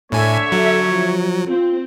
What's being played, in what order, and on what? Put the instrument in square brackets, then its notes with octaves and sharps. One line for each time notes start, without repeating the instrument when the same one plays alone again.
[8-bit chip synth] A2 G#5 [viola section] D3 E5 [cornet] C#5
[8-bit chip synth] F#3 [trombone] A4
[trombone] F3
[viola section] C4 [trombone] F4